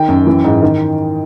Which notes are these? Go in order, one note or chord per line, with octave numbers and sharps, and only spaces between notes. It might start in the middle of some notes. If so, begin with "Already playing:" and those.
Already playing: D#3 G5
F#2
E3
G#2
D#3